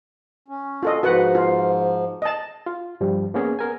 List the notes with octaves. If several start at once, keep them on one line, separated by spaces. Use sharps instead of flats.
C#4
F4 A4 D#5
G#2 F3 F#4 B4 F#5
F4
D#5 A5
F4
G2 F3 G3
A#3 B3 C#4 G#4
B3 A#4 G#5